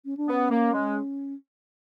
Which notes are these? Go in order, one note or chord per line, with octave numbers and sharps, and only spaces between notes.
C#4
D4
B3 C#4
A#3
G#3